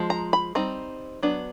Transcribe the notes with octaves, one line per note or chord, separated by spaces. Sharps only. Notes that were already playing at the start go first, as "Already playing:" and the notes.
Already playing: F3 G#3
A#5
B5
G3 C4 D#4 A#5
F#3 B3 D4